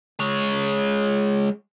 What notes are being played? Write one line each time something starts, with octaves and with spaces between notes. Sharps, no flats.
G#3 C#5